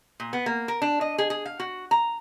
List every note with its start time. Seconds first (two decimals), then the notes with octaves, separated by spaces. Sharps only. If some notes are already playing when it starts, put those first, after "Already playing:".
0.20 A#2
0.33 B3
0.46 A#3
0.68 A#4
0.82 D4
1.01 D#5
1.18 G#4
1.30 G#4
1.45 F5
1.60 F#4
1.91 A#5